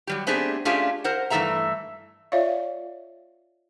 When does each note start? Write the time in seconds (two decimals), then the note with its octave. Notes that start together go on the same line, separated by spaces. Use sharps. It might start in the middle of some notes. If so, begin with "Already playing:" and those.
0.07 F#3 G3 G4
0.27 A3 B3 C4 D4 G4 G#4
0.65 A3 C#4 D4 F4 G4 G#4
1.04 A#4 C5 F#5
1.30 G2 E3 A3 A4 E5 A#5
2.32 F4 C#5 D5 E5 F5